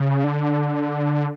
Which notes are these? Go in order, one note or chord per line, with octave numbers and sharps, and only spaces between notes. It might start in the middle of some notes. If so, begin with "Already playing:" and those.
Already playing: C#3
D3